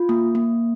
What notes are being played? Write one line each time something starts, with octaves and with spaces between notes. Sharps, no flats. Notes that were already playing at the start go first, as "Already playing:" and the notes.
Already playing: F4
A#3
A#3